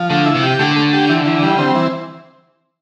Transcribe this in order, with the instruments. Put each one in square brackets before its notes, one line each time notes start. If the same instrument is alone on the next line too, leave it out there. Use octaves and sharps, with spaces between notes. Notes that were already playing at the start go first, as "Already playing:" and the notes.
Already playing: [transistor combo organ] F3
[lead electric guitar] D3 [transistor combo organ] A3
[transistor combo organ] E4
[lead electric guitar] C3
[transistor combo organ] G4
[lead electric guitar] D3 [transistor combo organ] A3
[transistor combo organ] A3
G4
E3
E3
G3
C4
E3